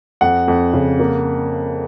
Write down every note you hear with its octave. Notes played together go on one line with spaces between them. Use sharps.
F2 F#5
F2
C#3
A#3